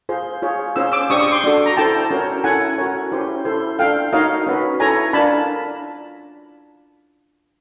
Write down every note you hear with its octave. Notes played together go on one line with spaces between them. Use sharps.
F4 G#4 C5
F4 G#4 C#5
C#4 F4 G#4 C5 E6
D6 E6
D4 G4 C5 C#6 D#6
C#6 D#6
C6 D6
D4 F#4 A4
A#5
E4 A4 C5 G5 A5
C#4 F#4 A#4 C#5
C#4 E4 A4 F#5 G#5
F#4 A#4 C#5
C#4 E4 G4 C5
E4 A4 C5
D4 F4 A4 F5 G5
D#4 F#4 A#4 C#5 D#5 F5
C#4 F#4 B4
E4 A4 C#5 G#5 A#5
D4 F4 A#4 A5 B5